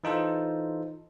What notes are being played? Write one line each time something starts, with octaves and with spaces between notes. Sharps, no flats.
E3 D#4 F4 A4 C5